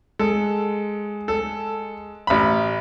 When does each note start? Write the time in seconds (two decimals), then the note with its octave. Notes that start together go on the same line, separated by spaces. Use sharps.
0.19 G#3 A4
1.28 A4
2.27 A1 B5